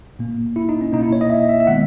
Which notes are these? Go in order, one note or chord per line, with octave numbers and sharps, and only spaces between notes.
A#2 A#3
E4
D#4
C#4
B2 A#3 D#4
E4
C#5
D#5
E5
E5
E5
D#3 G#3 B3 F#5